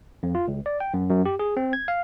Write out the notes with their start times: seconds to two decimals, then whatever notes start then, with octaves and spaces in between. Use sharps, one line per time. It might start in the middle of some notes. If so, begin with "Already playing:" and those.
0.23 F2
0.35 F4
0.48 C#2
0.66 D5
0.80 G5
0.94 F#2
1.10 F#2
1.26 G4
1.39 G#4
1.57 C4
1.73 G#6
1.88 F5